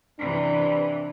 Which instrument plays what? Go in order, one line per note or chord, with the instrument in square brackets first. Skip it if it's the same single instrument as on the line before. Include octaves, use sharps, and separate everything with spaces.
[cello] C3 E3 [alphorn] D4